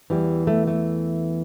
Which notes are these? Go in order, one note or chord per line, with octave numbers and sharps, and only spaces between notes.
E2 E3 G3
A3
A3